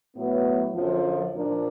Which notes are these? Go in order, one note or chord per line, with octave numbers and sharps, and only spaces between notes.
A2 F#3 B3
F#2 D3 F3
A#2 F3 A#3 D4